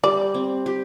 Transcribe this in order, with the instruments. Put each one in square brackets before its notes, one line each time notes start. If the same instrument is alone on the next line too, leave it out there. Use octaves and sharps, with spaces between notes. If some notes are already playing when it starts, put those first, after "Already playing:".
[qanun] G3 [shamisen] D5
[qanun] C4
G4